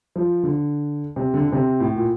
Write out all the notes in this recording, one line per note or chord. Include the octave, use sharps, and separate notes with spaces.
F3
D3
C3
D3
D3
C3
A2
A#2